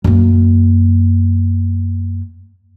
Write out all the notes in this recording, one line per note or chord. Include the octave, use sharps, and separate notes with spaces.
F#2 A#3